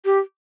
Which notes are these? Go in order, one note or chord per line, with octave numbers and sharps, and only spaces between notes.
G4